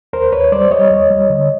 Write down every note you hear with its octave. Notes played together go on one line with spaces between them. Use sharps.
D#2 A#4 C5
D#2 B4 C#5
G3 C5 D5
G3 C#5 D#5
D#2
G3
D3